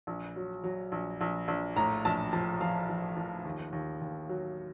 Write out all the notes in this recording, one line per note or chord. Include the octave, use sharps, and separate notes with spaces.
A#1
F#3
F#3
A#1
A#1
A#1
A2 A#5
A#1 A5
F3 A5
F3 F5
F3
F3
D#2
D#2
D#2
F#3